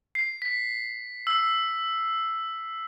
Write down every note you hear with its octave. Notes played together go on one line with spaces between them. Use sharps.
C7
B6
E6